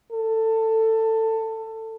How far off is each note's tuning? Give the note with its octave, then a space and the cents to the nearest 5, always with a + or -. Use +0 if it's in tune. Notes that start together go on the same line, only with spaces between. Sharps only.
A4 +20